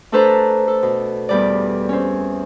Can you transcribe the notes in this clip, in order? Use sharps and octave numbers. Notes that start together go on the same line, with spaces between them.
A3 D4 A4 B4 C5 A#5
A4
B2
E2 G3 D5
C4 C#4